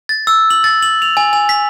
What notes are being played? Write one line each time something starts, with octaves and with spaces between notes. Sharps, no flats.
A6
E6
F#7
A6
F#7
F7
G#5
G#5
B6